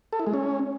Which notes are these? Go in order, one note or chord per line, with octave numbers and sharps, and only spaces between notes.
A4
E4
G#3
C#4